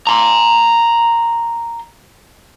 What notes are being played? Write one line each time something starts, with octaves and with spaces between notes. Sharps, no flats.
A#5 C6